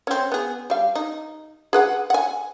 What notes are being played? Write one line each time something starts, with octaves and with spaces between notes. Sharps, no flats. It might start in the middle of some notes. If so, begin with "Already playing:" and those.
C4 C#4
B3 G#4
G3 F5
D#4
G#4 B4 F#5
F#5 G#5